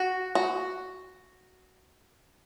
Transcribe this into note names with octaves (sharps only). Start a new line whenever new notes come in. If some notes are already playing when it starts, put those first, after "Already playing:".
Already playing: F#4
F#4